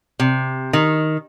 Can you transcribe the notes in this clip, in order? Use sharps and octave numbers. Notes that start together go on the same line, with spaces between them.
C3
D#3